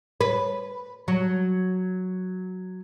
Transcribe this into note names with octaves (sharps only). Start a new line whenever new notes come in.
B4
F#3